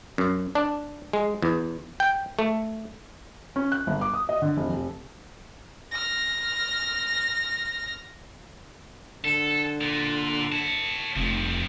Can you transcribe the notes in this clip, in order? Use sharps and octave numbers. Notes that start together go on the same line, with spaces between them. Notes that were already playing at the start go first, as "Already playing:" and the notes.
F#2
D4
G#3
E2
G5
A3
C#4
F#6
G1
D6
D#6
D#5
D3
F1
F1
F6 A#6
D3 A4
A#2
C#5 A5
F1 G2 F3